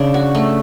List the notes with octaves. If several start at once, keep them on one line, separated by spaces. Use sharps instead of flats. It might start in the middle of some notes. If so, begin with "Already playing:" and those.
Already playing: C#3 D4
F#4
A3